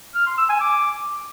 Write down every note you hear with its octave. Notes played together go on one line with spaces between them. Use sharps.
F6
C6
E6
G#5
D6